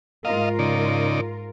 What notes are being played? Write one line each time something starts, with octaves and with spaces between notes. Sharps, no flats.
G#2 F4 A#4 D#5 F5
C#3 D#4 D5